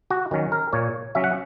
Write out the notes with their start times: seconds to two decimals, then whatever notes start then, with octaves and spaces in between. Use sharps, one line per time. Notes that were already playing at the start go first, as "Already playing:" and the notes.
0.10 F#4
0.31 D#3 F#3 C#4
0.52 A#4
0.73 A#2 C#5
1.15 F#3 C#4 E5
1.24 F#5